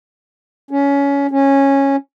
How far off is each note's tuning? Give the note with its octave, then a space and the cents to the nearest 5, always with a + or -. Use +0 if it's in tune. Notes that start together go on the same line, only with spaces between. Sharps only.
C#4 +20
C#4 -10